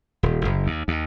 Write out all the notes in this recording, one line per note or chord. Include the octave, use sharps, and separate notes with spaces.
D#1
F#1
D#2
D#2